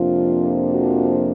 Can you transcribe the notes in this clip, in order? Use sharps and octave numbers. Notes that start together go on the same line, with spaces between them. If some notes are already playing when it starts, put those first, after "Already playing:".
Already playing: F2 C3 F3 A#3 D4 F4
F#4